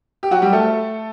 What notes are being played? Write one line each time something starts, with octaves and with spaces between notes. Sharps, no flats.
G4
F#3 F#4
G3 G4
A3 A4